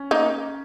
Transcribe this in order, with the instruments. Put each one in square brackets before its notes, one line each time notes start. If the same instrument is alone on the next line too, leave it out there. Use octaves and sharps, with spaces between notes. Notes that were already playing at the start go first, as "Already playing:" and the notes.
Already playing: [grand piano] C#4
[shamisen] A#3 D#4